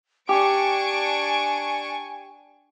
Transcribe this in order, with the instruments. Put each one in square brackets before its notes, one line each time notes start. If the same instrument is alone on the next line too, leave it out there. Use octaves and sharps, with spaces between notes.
[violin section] D4 C#6 D7 [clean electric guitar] G4 [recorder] G#5